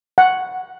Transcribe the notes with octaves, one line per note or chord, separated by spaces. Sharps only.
F#5